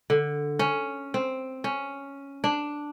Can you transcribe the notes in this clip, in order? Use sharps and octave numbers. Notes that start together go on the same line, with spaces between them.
D3
C#4
C4
C#4
D4